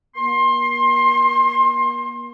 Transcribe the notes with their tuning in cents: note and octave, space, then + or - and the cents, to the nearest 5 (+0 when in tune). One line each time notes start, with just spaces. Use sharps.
A#3 +40 C6 +25